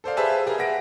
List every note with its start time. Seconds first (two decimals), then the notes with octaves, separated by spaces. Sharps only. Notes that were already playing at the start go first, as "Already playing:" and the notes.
0.04 A4 C5 D5 F5
0.17 G4 G#4 B4 C5 E5 A5
0.46 G4 G#4 A#4 A#5
0.58 E5 F#5 A#6 D7